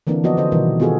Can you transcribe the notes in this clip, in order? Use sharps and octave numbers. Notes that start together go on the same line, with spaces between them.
D3 E3 A#3 C4 D4
F3 A#3 B3 F#4 D5 D#5
D3 C5 D#5
B2 D#3 E3 G3
B3 F4 F#4 G#4 A4